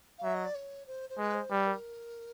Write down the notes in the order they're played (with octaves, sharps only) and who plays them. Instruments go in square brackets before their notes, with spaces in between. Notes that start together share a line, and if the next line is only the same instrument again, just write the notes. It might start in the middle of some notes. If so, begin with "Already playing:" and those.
[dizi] F5
[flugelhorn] F#3 [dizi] E5
[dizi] D#5
D5
C#5
C5
C5
[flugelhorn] G#3 [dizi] B4
[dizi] C5
[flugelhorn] G3 [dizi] B4
[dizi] A#4